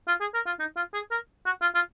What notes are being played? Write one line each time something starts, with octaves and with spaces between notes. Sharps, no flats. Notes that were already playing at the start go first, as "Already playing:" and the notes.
F4
G#4
A#4
F4
D#4
F4
G#4
A#4
F#4
F4
F4